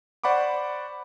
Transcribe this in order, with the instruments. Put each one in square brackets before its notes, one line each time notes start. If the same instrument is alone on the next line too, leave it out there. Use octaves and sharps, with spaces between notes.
[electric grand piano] C5 D5 F#5 B5 C#6 D6